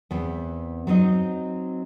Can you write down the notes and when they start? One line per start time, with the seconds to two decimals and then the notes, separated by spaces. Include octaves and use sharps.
0.11 E2 B3 C4
0.87 F#3 C4 D#4 D#5